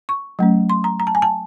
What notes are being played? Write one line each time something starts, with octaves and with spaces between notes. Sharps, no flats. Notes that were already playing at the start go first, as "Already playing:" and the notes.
C#6
F#3 A3 C#4
C6
A#5
A#5
A5
G#5
A5